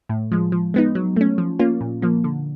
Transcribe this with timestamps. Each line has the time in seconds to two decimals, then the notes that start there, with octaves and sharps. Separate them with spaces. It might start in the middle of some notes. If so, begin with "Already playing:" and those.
0.09 A2
0.32 F3 G#3
0.52 F3
0.74 G#3 B3 D#4
0.95 F#3
1.16 A3 C#4
1.38 F3
1.59 A#3 C#4 F4
1.81 A#2
2.02 F3 A#3
2.24 D3